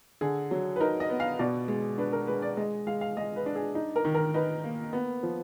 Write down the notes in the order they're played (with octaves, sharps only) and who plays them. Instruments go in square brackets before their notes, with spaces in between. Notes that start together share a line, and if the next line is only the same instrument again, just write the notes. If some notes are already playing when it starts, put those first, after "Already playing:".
[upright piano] D3 G#4
F#3
B4
D#4 A#4
D#5
B3
F5
B2 D5
G#3
D4 B4
A#4
G#3 B4
D5
G#3 D#5
G#3 F5
F5
G#3 D#5
B4
D4
G#4
D#4
A#4
D#3
A#4
D#4 B4
A#3
B3
F3